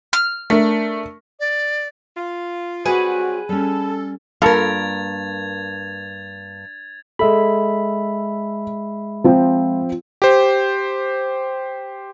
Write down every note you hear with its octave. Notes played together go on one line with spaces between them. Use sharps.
F6
A3 D4 A#4
D5
F4
F#3 G3 C4 F#4 G#4 B4 F#5 G#5
G3 C#4 A4 A5
G2 A#3 F4 A4 A#4 G#6 A6 F7
G#3 A4 E5 B5
F3 C4
G4 C5